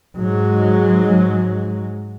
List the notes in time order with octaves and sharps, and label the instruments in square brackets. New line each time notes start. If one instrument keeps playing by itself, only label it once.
[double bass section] G#2 F#3 G#3